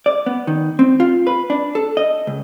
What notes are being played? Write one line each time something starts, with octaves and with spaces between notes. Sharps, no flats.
D5
B3
D#3
C4
F4
B4
D4
A4
D#5
C#2